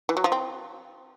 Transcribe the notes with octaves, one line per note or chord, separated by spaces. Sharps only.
E3
F#3
F3
C4